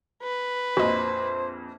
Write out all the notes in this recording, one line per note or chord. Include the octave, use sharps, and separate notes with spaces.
B4
A#1 F2 F#4 C5 D#5